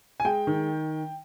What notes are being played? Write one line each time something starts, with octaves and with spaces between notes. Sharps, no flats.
G#5
G#3 G5
D#3